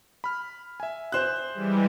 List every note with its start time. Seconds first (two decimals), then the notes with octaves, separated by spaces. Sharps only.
0.24 B5 F6
0.80 E5 G#5
1.12 C5 F#6
1.53 E3 G3 G#3